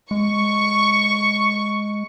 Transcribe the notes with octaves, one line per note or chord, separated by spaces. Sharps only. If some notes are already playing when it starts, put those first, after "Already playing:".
G#3 C#6